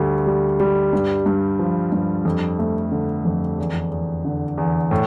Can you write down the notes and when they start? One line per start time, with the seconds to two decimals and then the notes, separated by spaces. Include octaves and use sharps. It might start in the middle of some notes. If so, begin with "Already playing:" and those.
Already playing: D2 G3
0.26 G3
0.60 G3
0.93 G2
1.26 G2
1.59 F3
1.92 G2
2.25 F2
2.59 A3
2.92 D3
3.25 F2
3.58 E2
3.91 E2
4.25 D3
4.57 E2
4.91 A2